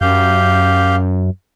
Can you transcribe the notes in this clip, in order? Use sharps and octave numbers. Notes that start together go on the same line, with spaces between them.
F#2 G4 F5 G6